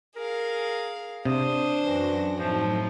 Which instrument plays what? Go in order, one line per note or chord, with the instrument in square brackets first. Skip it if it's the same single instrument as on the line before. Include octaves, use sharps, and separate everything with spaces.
[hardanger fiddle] G#4 F5 [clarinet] A#4
[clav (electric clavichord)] C3 [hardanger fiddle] D4 C5 [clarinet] D#6
[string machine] F#2 F#4 A#6 [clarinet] E3
[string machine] A2 F#3 D#4 [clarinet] F3 [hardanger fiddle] A3 C4